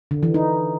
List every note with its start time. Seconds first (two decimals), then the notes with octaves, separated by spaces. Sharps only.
0.11 D3
0.23 E3
0.34 D#4